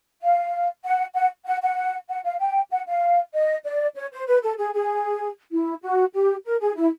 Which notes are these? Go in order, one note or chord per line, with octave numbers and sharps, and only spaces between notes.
F5
F#5
F#5
F#5
F#5
F#5
F5
G5
F#5
F5
D#5
D5
C#5
C5
B4
A4
G#4
G#4
E4
F#4
G4
A#4
G#4
E4